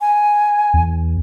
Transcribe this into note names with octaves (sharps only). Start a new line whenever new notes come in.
G#5
E2